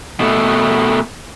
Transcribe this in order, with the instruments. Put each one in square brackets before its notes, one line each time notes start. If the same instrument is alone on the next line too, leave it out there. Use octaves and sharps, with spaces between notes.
[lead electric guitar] B2 A3